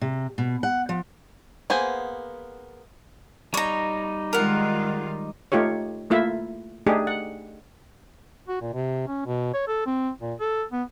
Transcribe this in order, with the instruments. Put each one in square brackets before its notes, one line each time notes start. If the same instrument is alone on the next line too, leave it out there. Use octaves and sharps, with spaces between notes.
[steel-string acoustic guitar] C3
B2
F#5
F3
[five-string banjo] A#3 B3 G#4 C5 G#5
[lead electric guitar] G3 D#4 [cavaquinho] C#5 A#5
[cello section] D#3 G#3 F4 [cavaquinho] A#4 F#5
[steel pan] A3 D#4 F4 G4 C#5
A3 A#3 E4 F4 E5
A3 D4 D#4 G4 G#4
F#5
[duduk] F#4
A#2
C3
C#4
B2
C#5
A4
C4
A#2
A4
B3